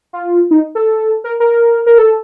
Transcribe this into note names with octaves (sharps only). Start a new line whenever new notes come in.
F4
D#4
A4
A#4
A#4
A#4
A4